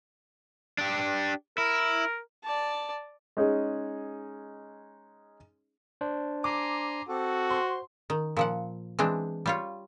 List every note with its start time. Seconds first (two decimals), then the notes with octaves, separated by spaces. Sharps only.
0.78 D4 G4
1.58 E4 A#4
2.44 D5 A5
3.37 G#3 C#4 D#4 G#4
6.01 D4 C5
6.44 G#5 A#5 C6 D6
7.09 C4 F#4 A4
7.50 C5 C6
8.10 D#3
8.37 A#2 F3 F#5
8.99 E3 G#3 C4 D4
9.46 G3 F4 C#5